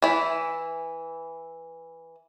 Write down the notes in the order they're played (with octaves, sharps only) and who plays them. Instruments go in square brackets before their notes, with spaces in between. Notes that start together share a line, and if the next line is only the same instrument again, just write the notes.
[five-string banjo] E3 E4